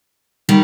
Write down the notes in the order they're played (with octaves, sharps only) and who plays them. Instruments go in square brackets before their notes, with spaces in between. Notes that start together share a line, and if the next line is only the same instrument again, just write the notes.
[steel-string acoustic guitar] D#3 G3